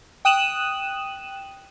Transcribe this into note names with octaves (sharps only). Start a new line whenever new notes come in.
G5 D#6 F#6 D#7 E7 F#7